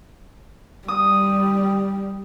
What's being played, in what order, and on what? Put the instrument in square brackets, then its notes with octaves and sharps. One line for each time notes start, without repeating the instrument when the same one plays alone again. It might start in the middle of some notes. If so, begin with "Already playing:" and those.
[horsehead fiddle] G3 [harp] D#6